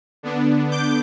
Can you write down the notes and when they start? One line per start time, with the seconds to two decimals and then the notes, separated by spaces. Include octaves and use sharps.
0.23 D3 B3 D4
0.71 D6 G6